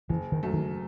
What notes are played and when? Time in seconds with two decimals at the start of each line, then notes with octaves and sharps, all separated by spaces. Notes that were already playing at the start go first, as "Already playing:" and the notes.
0.09 F#1 E3
0.32 D#3
0.43 F#2 F#3 A3
0.53 D#3